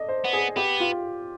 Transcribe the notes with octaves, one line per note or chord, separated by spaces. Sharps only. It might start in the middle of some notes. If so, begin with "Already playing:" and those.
Already playing: A4 D5 D#5
C5
B3
G#4
B3 G4
F4